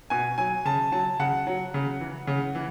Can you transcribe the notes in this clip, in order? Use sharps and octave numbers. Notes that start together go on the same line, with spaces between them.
B2 G#5
F#3 G#5
C#3 A5
F#3 A5
C#3 F#5
F#3
C#3
E3
C#3
E3